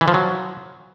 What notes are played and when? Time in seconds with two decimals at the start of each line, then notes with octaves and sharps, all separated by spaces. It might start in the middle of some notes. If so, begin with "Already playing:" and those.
0.01 E3
0.08 F3
0.14 F#3